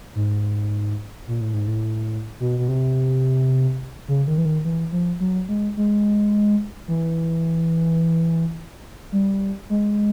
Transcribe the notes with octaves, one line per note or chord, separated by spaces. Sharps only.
G#2
A#2
A2
G#2
A2
B2
B2
C3
C#3
D#3
E3
D#3
E3
F3
F#3
G#3
G#3
E3
G3
G#3